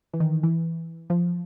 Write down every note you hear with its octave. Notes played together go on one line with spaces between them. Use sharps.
E3
D#3
E3
F3